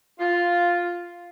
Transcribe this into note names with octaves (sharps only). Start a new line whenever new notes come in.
F4